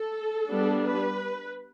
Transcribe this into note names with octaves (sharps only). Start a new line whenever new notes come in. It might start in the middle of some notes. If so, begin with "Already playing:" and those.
Already playing: A4
G3 B3 D4
B4